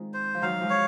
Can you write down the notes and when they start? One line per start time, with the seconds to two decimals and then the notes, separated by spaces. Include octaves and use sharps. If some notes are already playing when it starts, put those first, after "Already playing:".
Already playing: D#3 G#3 C4 F4
0.14 C5
0.34 F3
0.42 D#3 F#3 F5
0.61 F3 G#3
0.70 C#5